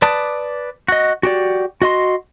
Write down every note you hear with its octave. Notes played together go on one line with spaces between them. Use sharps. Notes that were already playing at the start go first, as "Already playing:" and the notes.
B4 D5 A5 D6 D#6
F#4 D#5
F#4 G4 D5
F#4 D#5 C6